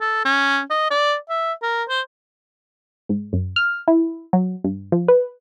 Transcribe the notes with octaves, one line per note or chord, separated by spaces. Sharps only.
A4
C#4
D#5
D5
E5
A#4
C5
G#2
F#2
F6
E4
F#3
G2
F3
B4